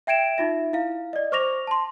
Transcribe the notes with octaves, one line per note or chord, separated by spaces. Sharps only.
E5 G5 G#6 D7 E7
D#4 F4 E5
E4 F5
D5 D#5
C5 C#6 D6 A#6 F7
A5 C6